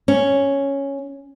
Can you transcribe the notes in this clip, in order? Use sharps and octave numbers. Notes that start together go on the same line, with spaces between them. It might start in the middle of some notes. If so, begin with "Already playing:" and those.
C#4